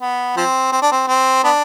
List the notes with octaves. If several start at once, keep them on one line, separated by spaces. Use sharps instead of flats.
B3
F3 C4
C4
D4
C4
C4
B3 D4